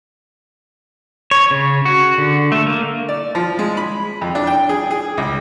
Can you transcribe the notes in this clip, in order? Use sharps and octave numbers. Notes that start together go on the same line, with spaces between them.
C#5
C#3
F#4
D3
A3
A#3
D5
F3
G#3
B5
F2
D4
G5
G#4
G#4
C#2